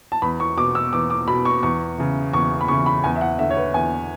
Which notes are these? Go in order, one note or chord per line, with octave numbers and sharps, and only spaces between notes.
A5
E2 B5
C#6
B2 D6
E6
E2 D6
D6
B2 B5
C#6
E2 C#6
C#3 E3
E2 C#6
B5
C#3 E3 C#6
B5
E2 G#5
E5
F#5
D3 E5
C#5
B4
E2 G#5